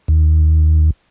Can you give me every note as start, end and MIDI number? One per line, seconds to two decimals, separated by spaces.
0.08 0.90 39